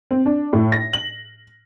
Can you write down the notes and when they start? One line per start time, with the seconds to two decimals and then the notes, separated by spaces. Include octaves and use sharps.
0.11 C4
0.26 D4
0.53 A2
0.72 A#6
0.93 F#7